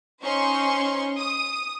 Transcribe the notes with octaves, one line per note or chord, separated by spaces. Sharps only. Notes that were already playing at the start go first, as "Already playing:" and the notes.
C#4 D#4 C5 C6 C#6
D#6